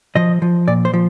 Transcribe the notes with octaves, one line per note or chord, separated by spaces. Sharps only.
F3 D#5
F3
A#2 D5
C5
F3